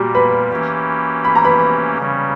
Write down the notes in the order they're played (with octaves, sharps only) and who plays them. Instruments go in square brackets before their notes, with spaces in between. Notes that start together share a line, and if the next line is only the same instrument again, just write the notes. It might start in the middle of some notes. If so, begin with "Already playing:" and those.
Already playing: [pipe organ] A#2 G3 A#3 [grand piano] F#4 G4
[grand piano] B4 B5
[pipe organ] E3 A#3 C#4 G4
[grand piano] B5
A#5
B4 B5
[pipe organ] C#3 G3 C#4